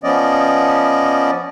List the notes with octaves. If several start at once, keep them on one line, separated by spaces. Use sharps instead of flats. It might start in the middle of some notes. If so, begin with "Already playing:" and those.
F3 B3 C#4 D5 D#5